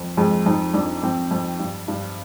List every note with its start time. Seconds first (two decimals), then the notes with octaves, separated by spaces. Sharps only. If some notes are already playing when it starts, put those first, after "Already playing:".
Already playing: F2
0.17 F2 G#3
0.46 F2 D#4
0.74 F2 D4
1.03 F2 C4
1.31 F2
1.59 G2
1.88 G2